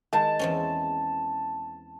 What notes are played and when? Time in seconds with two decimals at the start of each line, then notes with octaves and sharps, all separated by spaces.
0.13 D#3 G#3 A5
0.39 E2 C4 C#4